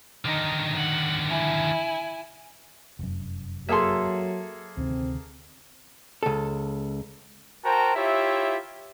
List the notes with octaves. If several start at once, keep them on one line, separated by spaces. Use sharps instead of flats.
D3 D#3 D#4 D#5
F#5
E4 G#5
F1 F#2
F#3 A#3 G#4 A4 E5 C6
D2 C3 D#3 C4
C#2 A4
F#4 A#4 C5 G5 A5 A#5
E4 F4 G4 C#5 E5